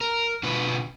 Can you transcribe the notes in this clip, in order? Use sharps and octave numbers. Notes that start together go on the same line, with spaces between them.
A#4
B2 D3 F4 B4